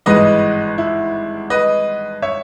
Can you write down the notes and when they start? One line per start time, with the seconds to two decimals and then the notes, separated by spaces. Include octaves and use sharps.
0.06 G#1 G2 E3 G#3 B4 D#5
0.78 E4
1.50 B4 D#5
2.22 C#5 E5